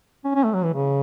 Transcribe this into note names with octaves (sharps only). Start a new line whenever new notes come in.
C#4
C#4
A3
F#3
E3
C#3